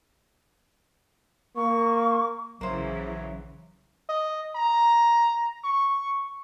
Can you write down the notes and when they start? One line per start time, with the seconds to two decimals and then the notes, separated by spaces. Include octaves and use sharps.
1.56 A#3 C#6
2.61 A#1 C#3 E3 F#3 A#3 C5 E5
4.09 D#5
4.56 A#5
5.64 C#6